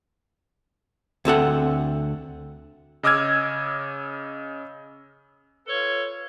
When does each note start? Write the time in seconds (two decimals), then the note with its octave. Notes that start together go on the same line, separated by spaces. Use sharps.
1.25 D2 C4 A4 F#5
3.03 C#3 D#5 D6 E6 F6 G#6
5.67 F4 A4 B4 C#5